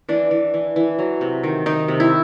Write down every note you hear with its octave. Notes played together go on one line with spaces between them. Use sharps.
E3 D4
E3
E3
E3
F#3
C3
D#3
D#3 D#4
C3
E4